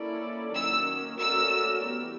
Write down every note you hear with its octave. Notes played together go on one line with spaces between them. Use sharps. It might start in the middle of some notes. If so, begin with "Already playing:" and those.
Already playing: A#3 C#4 E4 A4 D5
D#3 F#3 A#3 C#4 E6
A3 C#4 F#4 A#4 D5 E6
E3 G3 B3